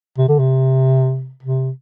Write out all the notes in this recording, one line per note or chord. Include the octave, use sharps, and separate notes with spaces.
C3
D3
C3
C3